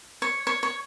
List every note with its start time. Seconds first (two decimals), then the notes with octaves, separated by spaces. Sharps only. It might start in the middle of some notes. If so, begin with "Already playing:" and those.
0.22 C#5
0.47 C#5
0.63 C#5